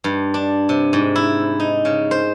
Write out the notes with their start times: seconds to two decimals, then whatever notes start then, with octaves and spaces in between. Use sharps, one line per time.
0.04 G2
0.34 D4
0.69 C3
0.93 G#2
1.16 E4
1.60 D#4
1.85 C#3
2.11 C5